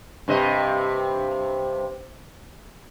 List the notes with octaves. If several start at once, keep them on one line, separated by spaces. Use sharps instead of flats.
G2 C3 D#5